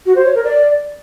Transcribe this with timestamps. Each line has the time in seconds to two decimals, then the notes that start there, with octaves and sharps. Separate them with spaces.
0.06 F#4
0.15 C5
0.25 C#5
0.35 A#4
0.44 D5